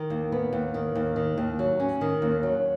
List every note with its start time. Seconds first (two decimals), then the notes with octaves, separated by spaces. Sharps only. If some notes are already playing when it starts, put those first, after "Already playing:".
Already playing: D#3
0.10 D#2
0.32 B3
0.53 D#2
0.74 D#3
0.95 D#2
1.16 D#3
1.38 D#2
1.59 F#3
1.80 C#4
2.01 D#3
2.22 D#2
2.43 F#3